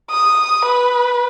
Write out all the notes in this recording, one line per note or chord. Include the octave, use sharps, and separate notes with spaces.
D#6
B4